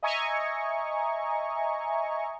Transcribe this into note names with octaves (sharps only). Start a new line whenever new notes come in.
D#5 E5 G#5 A#5 C#6